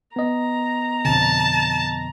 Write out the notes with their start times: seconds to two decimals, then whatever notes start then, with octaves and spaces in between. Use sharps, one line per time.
0.16 B3 D#5 A#5
1.05 F2 B2 D3 A5